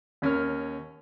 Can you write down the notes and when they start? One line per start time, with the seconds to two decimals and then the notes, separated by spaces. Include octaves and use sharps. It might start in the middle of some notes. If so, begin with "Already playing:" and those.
0.22 D#2 C#4 A#4 F6